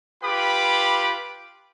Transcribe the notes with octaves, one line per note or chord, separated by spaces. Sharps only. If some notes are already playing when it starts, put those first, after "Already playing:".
F4 G4 B4 G5 B5 D6